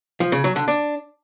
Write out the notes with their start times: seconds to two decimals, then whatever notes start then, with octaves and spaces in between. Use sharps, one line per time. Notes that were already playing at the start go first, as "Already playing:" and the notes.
0.20 F3
0.32 C#3
0.44 F#3
0.56 D3
0.68 D4